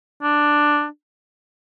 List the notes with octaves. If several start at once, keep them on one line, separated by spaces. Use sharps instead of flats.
D4